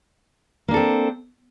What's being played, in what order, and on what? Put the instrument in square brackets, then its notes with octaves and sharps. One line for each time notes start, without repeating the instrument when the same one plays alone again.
[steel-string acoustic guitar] A#3
D4
A4
C4